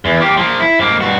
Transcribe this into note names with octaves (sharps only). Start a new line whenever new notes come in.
E2
A#3 G4
F3 A#3
E4
G#2 A#3
G2 F#4